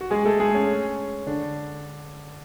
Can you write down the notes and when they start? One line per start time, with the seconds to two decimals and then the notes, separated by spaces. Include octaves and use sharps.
0.01 F#4
0.10 G#3 G#4
0.25 A3 A4
0.40 G#3 G#4
0.54 C#4
1.27 D3 D4